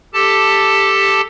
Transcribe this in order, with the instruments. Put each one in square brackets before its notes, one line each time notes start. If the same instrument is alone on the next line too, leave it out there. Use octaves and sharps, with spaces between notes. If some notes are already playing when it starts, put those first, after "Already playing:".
[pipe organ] G4 A4 A5